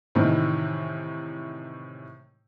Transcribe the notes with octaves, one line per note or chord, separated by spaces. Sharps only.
A2 C3 D#3 E3 G#3